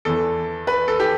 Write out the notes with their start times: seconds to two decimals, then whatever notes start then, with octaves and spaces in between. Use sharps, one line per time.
0.05 E2 E3 A4
0.67 B4
0.88 A4
1.00 G4